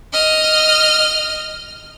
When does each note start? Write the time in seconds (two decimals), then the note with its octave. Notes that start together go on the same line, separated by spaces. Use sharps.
0.13 D#5 F6